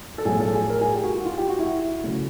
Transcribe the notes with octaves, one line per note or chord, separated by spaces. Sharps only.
A4
B1 A2 F3 G#4
A4
G#4
A#4
G#4
G4
F#4
F4
F4
G4
F#4
E4
C#3 F#3 A3